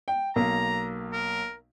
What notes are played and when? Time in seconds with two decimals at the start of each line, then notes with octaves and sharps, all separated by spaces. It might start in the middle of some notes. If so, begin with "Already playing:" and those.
0.08 G5
0.36 B1 A#3 A#5
1.13 A#4